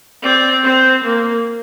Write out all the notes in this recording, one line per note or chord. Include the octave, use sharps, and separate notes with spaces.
C4 D5
C4 C5
A#3